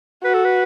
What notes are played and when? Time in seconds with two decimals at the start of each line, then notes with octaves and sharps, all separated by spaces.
0.24 F#4 B4
0.34 A4
0.45 B4